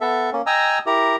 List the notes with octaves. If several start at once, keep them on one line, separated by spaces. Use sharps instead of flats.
B3 A4 E5
A#3 C#4
D#5 G5 G#5 A#5 E6
E4 G4 A#4 A#5